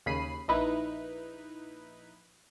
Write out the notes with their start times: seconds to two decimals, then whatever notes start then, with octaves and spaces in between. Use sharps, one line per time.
0.06 D#2 C#3 B5 C7 D#7
0.48 A#1 D#4 E4 B4